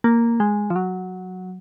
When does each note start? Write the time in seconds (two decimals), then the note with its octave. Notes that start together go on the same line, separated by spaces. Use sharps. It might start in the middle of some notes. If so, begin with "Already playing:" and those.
0.04 A#3
0.40 G#3
0.70 F3
0.76 F#3